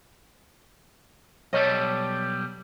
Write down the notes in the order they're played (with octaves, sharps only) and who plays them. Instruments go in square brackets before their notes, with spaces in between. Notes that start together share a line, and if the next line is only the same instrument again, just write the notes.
[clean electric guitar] B1 G3 A4 [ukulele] C#5 D#5